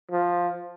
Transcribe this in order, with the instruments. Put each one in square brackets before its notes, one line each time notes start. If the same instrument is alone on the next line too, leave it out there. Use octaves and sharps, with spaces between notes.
[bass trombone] F3